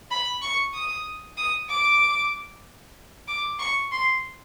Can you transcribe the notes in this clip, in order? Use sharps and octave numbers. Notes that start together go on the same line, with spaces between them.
B5
C#6
D#6
D#6
D6
D6
C#6
C6